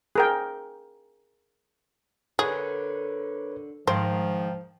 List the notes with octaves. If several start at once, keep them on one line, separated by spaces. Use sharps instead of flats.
G#4 A#4 G5
D3 G#4 A#4 B4 C#5
G#2 D#3 F3 C5 F5 G5 A#5